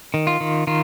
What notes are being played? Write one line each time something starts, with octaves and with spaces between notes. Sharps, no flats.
D#3
F4
D#3
D#3 F4